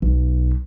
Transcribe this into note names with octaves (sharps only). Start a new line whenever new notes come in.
B1